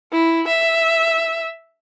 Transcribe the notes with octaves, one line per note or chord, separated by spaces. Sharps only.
E4
E5